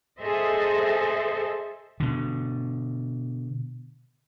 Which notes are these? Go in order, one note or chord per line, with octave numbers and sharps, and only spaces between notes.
G#4 A4 C5 D#5 E5
B2 D3